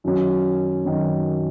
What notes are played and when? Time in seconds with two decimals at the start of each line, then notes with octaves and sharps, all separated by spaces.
0.04 F#2 D#3 F#3 C#4
0.85 F#2 D#3 F#3 C#4